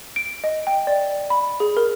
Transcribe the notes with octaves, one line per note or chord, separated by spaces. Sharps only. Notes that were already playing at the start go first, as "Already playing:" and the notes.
D7
D#5
G5
D5
B5
G#4
A#4